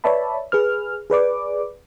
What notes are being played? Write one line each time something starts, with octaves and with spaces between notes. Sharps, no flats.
B4 C#5 D5 E5 A5 B5
G#4 B4 F6
G#4 B4 D5 D6